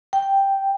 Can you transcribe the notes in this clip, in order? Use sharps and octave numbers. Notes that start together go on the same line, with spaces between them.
G5